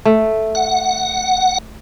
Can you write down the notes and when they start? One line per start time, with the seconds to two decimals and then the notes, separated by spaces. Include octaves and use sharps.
0.05 A3
0.55 F#5